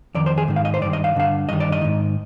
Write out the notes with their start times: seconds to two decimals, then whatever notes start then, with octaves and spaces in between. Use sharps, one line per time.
0.15 F2 D#3 D5
0.26 C5
0.38 G#4
0.48 G#2 D#3
0.56 F5
0.65 D#5
0.74 C5
0.81 G2 D5
0.85 D#3
0.93 D#5
1.04 F5
1.15 G2 D3 F5
1.49 G2 D#3 D#5
1.60 D5
1.72 D#5
1.81 G#2 D#3